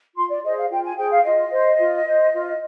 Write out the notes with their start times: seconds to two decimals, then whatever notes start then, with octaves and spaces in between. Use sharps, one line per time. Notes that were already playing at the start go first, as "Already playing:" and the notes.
0.16 F4 C6
0.29 D5
0.43 G#4 C5 D#5
0.57 F5
0.70 F4 G5
0.83 G#5
0.97 G#4 C5 G5
1.10 F5
1.23 F4 D#5
1.51 C5
1.78 F4
2.04 C5
2.31 F4